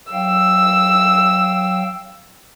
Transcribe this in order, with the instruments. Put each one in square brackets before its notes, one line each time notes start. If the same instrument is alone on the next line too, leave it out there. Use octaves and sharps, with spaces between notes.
[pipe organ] F#3 F5 G5 [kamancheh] E6